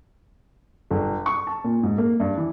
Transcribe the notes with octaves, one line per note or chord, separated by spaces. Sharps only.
G1
C#6
A5
A#2
G#2
A#3
G2
E3